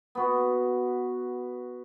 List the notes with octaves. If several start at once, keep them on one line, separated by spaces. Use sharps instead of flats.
B3 F#4